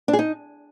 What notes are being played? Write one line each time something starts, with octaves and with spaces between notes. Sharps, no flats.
D4
G#4
D#4